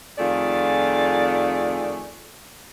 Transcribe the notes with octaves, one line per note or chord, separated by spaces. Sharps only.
F2 D#3 A3 F4 G#4 D5